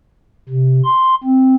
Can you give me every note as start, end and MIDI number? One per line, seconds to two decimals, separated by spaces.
0.49 0.81 48
0.84 1.15 84
1.24 1.55 60